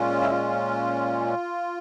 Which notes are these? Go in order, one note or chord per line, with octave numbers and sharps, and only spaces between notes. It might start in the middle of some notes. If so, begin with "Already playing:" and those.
Already playing: A#2 G#3 C#4 F4
E4
F4